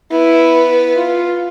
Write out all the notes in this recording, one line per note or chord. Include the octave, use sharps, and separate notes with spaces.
B3 E4
F4